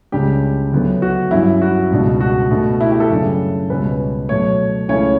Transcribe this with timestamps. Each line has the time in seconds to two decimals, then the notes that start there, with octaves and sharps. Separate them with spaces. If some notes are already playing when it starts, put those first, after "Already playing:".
0.12 C#2 C#3 G3 D4 G4
0.72 D2 D3 F#3 B3
1.02 F#4
1.31 G2 F#3 C#4 E4
1.62 F#4
1.91 C#2 B2 G3 D4
2.20 F#4
2.51 B2 A3 D4
2.81 E4
2.91 G4
3.00 A4
3.10 F#2 C#3 G3 D4
3.70 C#2 B2 G3 C#4 B4
4.29 B2 F#3 A3 C#5
4.89 C#2 C#3 E3 A3 C#4 C#5